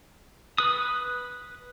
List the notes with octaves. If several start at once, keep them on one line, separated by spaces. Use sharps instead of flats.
B4 D#6